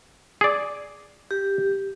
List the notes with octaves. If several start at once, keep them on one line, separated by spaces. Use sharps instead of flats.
G#4 D5
G4